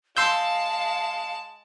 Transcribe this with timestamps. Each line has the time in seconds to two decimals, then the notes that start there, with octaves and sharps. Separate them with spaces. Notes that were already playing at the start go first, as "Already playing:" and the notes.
0.17 G#3 F5 A5 C6 E6 G6